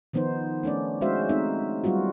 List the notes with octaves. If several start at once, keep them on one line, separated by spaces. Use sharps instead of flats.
D#3 F3 B3 D#4 C5
A3 C#4 D4 D5
G#3 C#4 F#4 C5 E5 F5
A3 C4 D#4 E5
F#3 G3 B3 F4 F#4